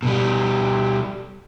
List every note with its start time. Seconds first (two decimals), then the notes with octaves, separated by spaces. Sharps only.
0.03 B2 G3